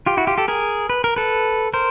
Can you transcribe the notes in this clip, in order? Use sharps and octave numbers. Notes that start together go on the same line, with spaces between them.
F4 G4
E4 F#4
F4 G4
G4 A4
G#4 A#4
B4
A#4
A4 B4
A#4 C5